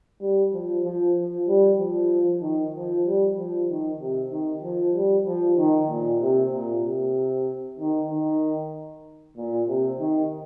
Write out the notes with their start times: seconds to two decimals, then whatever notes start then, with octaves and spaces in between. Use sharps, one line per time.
0.21 G3
0.53 F3
0.84 F3
1.16 F3
1.48 G3
1.78 F3
2.41 D#3
2.74 F3
3.06 G3
3.36 F3
3.68 D#3
4.00 C3
4.31 D#3
4.62 F3
4.94 G3
5.26 F3
5.58 D#3
5.89 A#2
6.21 C3
6.53 A#2
6.84 C3
7.79 D#3
8.10 D#3
9.37 A#2
9.68 C3
10.00 D#3